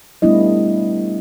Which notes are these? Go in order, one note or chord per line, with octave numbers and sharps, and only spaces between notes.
G3 A3 B3 D4 E4 D#5